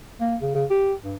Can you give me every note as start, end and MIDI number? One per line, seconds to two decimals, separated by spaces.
0.20 0.36 58
0.41 0.53 49
0.55 0.65 49
0.70 0.93 67
1.04 1.16 43